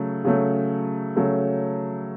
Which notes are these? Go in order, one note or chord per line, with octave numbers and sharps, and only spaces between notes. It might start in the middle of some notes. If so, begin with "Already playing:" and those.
Already playing: C#3 F#3 A3
C#3 F#3 A3
C#3 F#3 A3